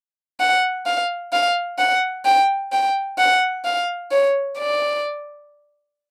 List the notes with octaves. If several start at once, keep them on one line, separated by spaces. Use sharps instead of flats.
F#5
F5
F5
F#5
G5
G5
F#5
F5
C#5
D5